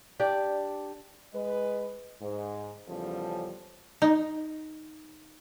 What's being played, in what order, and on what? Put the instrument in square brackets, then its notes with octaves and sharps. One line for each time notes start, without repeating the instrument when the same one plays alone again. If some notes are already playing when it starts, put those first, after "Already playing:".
[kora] D4 G4 D5
[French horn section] G#3 B4 D#5
G#2
E2 C#3 F3 G3 C#4 A4
[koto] D#4